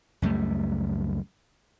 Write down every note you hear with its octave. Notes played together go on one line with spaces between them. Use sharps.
C#2 F#2 G3 A3